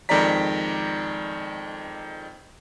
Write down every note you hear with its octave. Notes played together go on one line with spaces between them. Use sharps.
F2 D#3 G#3 D5 A#5 B6